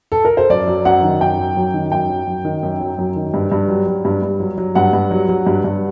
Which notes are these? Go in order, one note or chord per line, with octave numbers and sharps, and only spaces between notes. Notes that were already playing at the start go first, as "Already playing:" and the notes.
A4
A#4
C5
F#2 D5
F#3
F#2 F#5
D#3
F#2 G5
F#3
F#2
D#3
F#2 G5
F#3
F#2
D#3
F#2
F#3
F#2
D#3
G2
G2
F#3
F#3
G2
G2
F#3
F#3
G2 F#5
G2
F#3
F#3
G2
G2